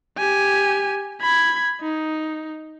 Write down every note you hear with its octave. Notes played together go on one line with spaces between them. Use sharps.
G4 G#5
B5 G#6
D#4